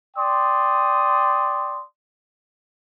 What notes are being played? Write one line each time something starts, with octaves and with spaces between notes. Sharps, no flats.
D5 G5 C6 D#6